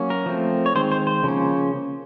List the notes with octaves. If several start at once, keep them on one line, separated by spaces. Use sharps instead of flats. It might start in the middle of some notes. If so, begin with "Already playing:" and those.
Already playing: F#3 A#3 C#4
A#4
F3 A3 C4
C#5
D#3 G#3 C4 C5
C5
C5
C#3 F3 A#3 C#4